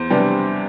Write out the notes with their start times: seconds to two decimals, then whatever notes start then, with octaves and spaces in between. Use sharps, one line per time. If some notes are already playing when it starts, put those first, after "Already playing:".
Already playing: E2 C5
0.10 C3 G3 B3 D4